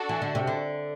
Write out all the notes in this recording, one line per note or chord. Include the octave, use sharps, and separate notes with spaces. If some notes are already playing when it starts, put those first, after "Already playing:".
Already playing: D4 F#4 A4
E3
D3
C3
D3